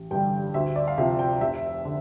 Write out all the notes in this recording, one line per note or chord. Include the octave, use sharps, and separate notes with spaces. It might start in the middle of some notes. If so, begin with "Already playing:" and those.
Already playing: A1
G2 D3 G3 G5
D2 E5
D5
F5
C3 F3 E5
G5
F1 E5
D3